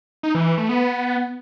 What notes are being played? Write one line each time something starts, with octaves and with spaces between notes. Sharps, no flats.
D#4
E3
E3
A3
B3